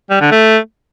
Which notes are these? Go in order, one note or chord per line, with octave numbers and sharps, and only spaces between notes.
G3
D3
A3